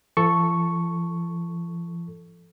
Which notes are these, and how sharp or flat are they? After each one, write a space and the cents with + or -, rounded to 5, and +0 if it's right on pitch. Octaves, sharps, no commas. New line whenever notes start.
F3 -45 A4 +0 C#6 +0